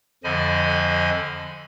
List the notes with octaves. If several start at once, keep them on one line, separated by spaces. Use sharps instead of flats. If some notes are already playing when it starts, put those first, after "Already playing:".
F2 D3 F3 D#5 G#5 B5